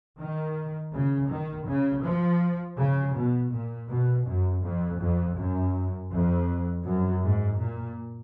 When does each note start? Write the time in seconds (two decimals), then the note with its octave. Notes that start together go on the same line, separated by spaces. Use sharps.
0.18 D#3
0.93 C#3
1.30 D#3
1.67 C#3
2.04 F3
2.78 C#3
3.15 B2
3.51 A#2
3.89 B2
4.27 F#2
4.64 F2
5.01 F2
5.37 F#2
6.12 F2
6.85 F#2
7.23 G#2
7.60 A#2